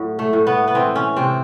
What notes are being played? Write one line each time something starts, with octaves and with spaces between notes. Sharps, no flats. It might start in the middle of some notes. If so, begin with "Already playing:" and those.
Already playing: A2 F#3
A3
A2
B3
B3
E3 C4
C#4
C3 C4